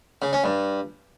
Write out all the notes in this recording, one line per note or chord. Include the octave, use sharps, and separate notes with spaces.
C#3
C#4
G2